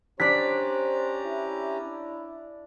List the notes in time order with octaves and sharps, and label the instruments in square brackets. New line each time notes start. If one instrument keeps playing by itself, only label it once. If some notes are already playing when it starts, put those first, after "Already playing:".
[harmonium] C#4 G4 A#5 [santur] D4 D5 [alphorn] C5 [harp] B6
[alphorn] E4